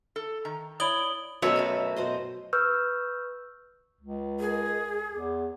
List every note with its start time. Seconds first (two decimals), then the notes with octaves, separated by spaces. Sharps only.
0.16 A4
0.45 D#3 A#5
0.80 E4 C#5 D5 D#6 F#7 G7
1.42 F#2 B2 A3 C#5 D#5 E5
1.56 A4 F5 B5
1.96 B2 C5 D#5
2.53 B4 C#6 E6 F6 G6
4.01 C#2
4.40 G#4 A#4 D#5
5.15 E2 D6